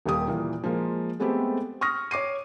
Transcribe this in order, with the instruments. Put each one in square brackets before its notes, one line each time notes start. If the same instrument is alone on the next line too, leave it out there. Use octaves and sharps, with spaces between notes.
[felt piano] D#1 D#2 G4 D#6
A#2 E3 A#3
F3 G#3 A#3 F4
G#3 A3 B3 C4 G4 A4
C#6 D#6 F6 A#6
C#5 D6 C7 D#7